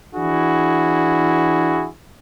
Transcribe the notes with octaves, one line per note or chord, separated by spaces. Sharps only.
E3 D4 E4 F#4 G#4